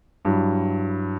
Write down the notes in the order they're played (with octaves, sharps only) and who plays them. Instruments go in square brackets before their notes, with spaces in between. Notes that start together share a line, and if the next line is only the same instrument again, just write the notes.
[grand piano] G2 F#3 E4